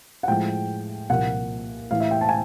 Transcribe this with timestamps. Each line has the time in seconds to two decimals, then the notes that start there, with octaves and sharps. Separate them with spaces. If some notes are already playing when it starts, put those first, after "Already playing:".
0.23 F#5
0.28 A2 F3 G#3 G5
1.09 C2 A#2 F3 A#3 F#5
1.91 A2 E3 A3 F5
2.00 E5
2.11 G5
2.21 A5
2.29 G#5